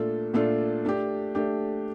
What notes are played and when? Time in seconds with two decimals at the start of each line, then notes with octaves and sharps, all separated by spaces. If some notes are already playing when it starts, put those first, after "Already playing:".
Already playing: A#2 A3 D4 F4 A4
0.33 A#2 A3 D4 F4 A4
0.85 A3 D4 G4
1.35 A3 D4 G4